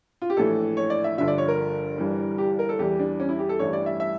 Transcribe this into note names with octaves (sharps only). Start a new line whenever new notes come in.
F4
G4
A#1 A2 E3 A4
C#5
D5
E5
G1 G2 D3 F3 E5
D5
C#5
A#4
G1 G2 E3 G3
G4
A#4
A4
E2 E3 G3 G4
D4
C#4
E4
G4
A4
A1 G2 E3 G3 C#5
D5
E5
E5